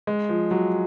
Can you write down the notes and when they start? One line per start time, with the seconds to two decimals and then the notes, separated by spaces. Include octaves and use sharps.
0.07 G#3
0.29 F3
0.51 F#3